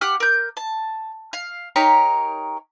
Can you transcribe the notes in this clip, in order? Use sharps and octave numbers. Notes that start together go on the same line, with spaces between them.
G4 F#5 F6
A#4 G6
A5
F5
D#4 G4 A#4 C#5